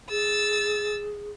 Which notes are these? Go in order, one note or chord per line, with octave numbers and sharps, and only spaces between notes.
G#4 E6 A6